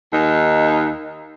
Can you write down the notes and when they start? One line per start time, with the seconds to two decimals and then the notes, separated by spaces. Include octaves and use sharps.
0.12 D#2 D#4